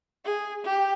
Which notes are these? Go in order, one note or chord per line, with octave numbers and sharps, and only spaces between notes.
G#4
G4